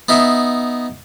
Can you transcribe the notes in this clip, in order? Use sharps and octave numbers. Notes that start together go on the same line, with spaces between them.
B3 D#4 E5